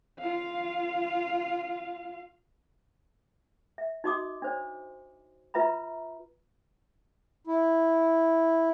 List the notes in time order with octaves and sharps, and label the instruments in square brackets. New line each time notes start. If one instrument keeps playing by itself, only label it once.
[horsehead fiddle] F4 F5
[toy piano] E5
D#4 F#4 D#5 C6 D6 D#6
D4 C5 C#5
F4 B4 E5 A#5 B5
[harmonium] E4